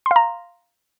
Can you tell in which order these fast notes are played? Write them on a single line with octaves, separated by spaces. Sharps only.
C6 F5 A#5